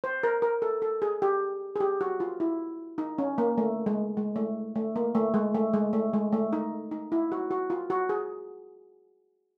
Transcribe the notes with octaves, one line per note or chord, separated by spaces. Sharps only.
C5
A#4
A#4
A4
A4
G#4
G4
G#4
G4
F#4
F4
E4
D#4
C#4
A#3
A3
G#3
G#3
A3
A3
A#3
A3
G#3
A3
G#3
A3
G#3
A3
D#4
D#4
E4
F#4
F#4
F4
F#4
G#4